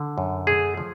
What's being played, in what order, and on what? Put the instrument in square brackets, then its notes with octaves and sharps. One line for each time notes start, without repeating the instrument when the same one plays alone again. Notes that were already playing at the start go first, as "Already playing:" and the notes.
Already playing: [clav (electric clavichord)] D3
F#2
A3 G#4
F3